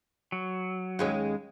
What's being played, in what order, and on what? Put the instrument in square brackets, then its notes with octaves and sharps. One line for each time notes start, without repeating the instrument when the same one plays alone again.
[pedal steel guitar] F#3
[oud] D#2 G#3 C#4